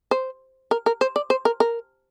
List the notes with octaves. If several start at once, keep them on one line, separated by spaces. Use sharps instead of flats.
C5
A#4
A#4
C5
D5
C5
A#4
A#4